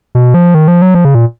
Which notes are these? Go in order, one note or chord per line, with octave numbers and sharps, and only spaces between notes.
B2
F3
D#3
F3
F#3
F3
C#3
A#2